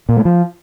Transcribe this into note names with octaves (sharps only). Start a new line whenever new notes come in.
A#2
A3
F3